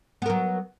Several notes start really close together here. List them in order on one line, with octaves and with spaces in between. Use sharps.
B3 A#4 F#3